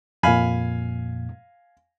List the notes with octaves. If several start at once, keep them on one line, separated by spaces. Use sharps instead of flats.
F2 A#2 F5 G#5 B5